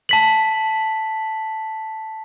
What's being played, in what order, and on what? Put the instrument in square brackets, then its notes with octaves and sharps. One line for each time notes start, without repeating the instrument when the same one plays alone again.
[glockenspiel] A5 B6 F#7